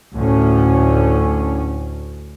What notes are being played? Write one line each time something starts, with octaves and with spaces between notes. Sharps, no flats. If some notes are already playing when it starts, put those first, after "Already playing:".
D2 A2 C#4